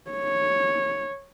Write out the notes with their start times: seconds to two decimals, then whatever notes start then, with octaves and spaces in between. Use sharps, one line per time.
0.11 C#5